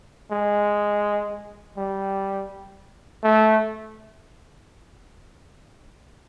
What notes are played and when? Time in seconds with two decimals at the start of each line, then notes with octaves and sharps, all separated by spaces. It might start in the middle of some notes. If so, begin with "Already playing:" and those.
0.31 G#3
1.77 G3
3.24 A3